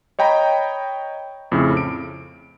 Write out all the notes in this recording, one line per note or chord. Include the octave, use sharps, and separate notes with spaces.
C#5 D#5 G5 A#5 B5
F2 A2 C#3
D7